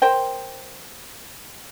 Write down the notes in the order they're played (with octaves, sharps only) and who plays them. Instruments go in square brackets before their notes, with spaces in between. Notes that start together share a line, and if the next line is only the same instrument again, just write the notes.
[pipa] A#4 C5 G5